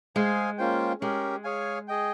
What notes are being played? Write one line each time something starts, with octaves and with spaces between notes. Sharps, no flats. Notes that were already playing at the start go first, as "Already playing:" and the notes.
G#3 G#4 C5 F5 G#5
A#3 C#4 F4 C5 G5
G#3 C#4 G4 A#4
G#4 C#5 F5 G#5
G#4 D#5 G5